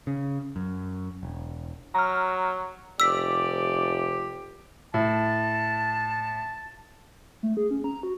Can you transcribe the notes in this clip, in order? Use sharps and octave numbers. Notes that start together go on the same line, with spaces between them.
C#3
F#2
E1
F#3 A#5 F6
F1 G4 D5 E6 B6
A2 A5
A3
G#4
C#4
A#5
F#4